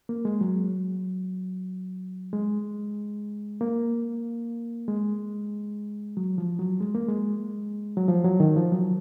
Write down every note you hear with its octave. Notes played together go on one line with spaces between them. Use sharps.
A#3
G#3
F#3
G#3
A#3
G#3
F#3
F3
F#3
G#3
A#3
G#3
F#3
F3
F#3
D#3
F3
F#3